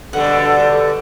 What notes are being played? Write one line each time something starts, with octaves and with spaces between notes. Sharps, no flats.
B2 D3 G3 A4 F#5